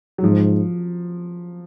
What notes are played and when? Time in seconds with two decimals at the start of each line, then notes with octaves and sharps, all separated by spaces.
0.18 F#3
0.23 G#2 F3